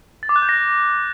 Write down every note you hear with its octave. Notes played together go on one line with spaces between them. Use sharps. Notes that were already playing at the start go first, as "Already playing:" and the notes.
A6
D6
F#6
G6
A#6